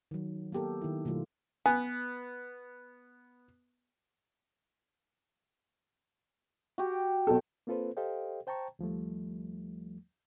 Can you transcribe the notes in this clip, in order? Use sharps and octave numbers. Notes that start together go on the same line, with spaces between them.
D#3 F#3
A#3 B3 G4 A4 A#4
D#3 E4
B2 D#3 F#3 A3 F4
B3 G#5
F#4 G4
B1 A4
A#3 C4 F4 A4 B4 C5
G4 A4 C5 D#5 F5 G5
C5 G5 A5 A#5 C#6
D#2 F3 G3 A3